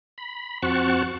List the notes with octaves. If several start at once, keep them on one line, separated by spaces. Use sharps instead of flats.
B5
F2 C4 F#4 F#5 A5 C#6